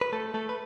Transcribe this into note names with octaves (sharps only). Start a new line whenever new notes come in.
B4
A3 A4
A3 A4
B4